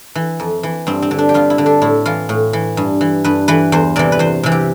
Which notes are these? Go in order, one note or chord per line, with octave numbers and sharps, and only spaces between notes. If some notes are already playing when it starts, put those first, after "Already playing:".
E3
F2
E3
G2 C4
C4
D3
D4
G4
G2 F4
E4
D3
D4
A2 E4
E3 F4
A2
E3
G2
E3
G2 B4
E3 B4
E2 C5
C3 E3 D5
B4
E2 C5
C3 E3
G4